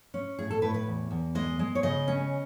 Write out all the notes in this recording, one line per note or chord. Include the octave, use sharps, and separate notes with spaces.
C#4
A2 G#4
A4
A2 B4
B4
E2
E2
G#3 D#5
G#3
C#5
C#3 D#5
C#4